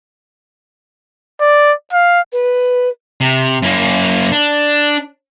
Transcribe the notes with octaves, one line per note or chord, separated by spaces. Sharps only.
D5
F5
B4
C3
F#2 A#3
D4